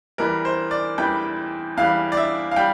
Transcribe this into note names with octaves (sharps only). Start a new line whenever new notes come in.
E2 E3 G3 A#4
C5
D5
E2 E3 G3 G5
E2 E3 G3 F5
D5
E5
F5
G3 G5